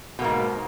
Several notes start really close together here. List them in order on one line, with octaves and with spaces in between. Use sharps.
B2 A#3 G#2